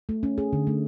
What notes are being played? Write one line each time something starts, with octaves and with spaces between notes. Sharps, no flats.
A3
C#4
G#4
D3
A3